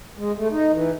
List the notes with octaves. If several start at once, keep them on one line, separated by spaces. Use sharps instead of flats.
G#3
A3
D#4
E3